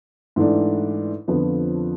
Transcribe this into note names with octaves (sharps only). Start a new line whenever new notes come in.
G#2 E3 A3 D4
F2 D3 F3 B3